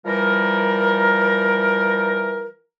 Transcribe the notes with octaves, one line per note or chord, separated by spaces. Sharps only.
E3 F3 G3 A#4